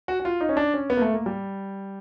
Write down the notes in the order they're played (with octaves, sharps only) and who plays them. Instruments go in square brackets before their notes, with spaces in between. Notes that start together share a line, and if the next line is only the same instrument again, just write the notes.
[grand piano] F#4
F#4
F4
D#4
C#4
D4
C#4
B3
A#3
A3
A#3
G3